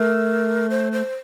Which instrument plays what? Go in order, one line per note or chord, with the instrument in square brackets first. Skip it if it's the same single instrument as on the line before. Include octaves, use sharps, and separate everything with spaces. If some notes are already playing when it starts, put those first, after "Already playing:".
Already playing: [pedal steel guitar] A3 [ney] A#4
[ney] C5
C5